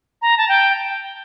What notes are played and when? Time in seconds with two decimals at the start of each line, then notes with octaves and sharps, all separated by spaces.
0.22 A#5
0.38 A5
0.49 G5